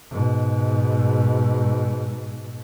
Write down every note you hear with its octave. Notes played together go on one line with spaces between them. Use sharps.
G#2 B2